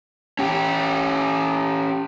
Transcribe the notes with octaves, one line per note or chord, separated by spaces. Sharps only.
C#4 G4